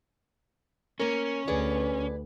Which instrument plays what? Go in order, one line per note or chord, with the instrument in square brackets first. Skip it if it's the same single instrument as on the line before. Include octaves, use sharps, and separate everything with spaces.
[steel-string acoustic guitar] A#3 A#4 [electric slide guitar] C#4
[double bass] D2 [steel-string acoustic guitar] G#4 B4 D5